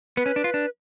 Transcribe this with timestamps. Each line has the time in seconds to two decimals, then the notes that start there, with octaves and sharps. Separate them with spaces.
0.17 B3 B4
0.26 C#4
0.36 D4
0.44 F4
0.54 D4